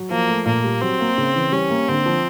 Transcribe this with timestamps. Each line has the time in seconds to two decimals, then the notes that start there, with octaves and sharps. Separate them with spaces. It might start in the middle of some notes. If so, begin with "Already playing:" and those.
Already playing: F#3
0.10 F3 A#3
0.28 A3
0.46 A#2 A#3
0.64 G3
0.81 F#3 C4
1.00 A#3
1.18 C#3
1.34 E3
1.52 G3 C#4
1.70 A#3
1.88 D3 C4
2.06 F3